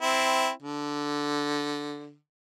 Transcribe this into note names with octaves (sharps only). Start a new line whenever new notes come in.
C4 E4
D3